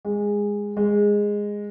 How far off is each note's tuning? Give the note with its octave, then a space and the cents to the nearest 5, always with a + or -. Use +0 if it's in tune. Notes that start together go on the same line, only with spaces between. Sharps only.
G#3 -15
G#3 -10